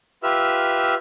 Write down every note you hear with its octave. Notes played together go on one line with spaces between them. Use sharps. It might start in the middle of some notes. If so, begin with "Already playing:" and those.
F4 G4 B4 E5 E6 F6